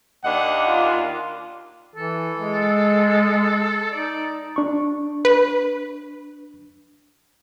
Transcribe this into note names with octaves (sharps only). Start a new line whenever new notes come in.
D#2 D4 D#5 F#5
F4
E3 A4
G#3
D#4 D5
D4 C#6
B4